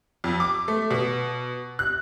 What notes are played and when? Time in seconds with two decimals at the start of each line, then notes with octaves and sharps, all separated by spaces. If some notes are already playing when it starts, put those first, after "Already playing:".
0.24 F2
0.40 D6
0.68 A3
0.91 B2
1.79 F#6